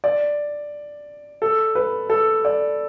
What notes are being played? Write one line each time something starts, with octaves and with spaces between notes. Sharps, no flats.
D5
A4
B4
A4
D5